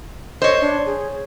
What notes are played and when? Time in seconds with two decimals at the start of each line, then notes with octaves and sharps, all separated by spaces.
0.42 C5 C#5 D#5
0.61 D4
0.86 G#4